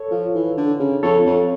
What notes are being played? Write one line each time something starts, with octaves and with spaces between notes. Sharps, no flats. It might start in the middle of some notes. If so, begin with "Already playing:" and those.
Already playing: A4 C#5
F3
E3
D3
C#3
F2 A4 C#5
F2